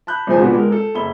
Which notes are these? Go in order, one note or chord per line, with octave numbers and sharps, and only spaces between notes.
A5 B5 F#6 G6
C#2 G2 E3 F3 C4 G#5
A#2 D3 B3 F#4 G4
G#3 A#4
A4
F#1 B5 G7